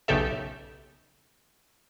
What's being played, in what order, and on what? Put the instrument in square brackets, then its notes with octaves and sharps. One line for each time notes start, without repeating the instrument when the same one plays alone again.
[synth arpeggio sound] B1 C#3 G4 A4 E5